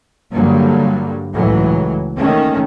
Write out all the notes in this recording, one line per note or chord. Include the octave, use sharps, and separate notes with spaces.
G2 D3 F#3 G3 A#3
C#2 A2 E3 F#3
D#3 A3 A#3 C#4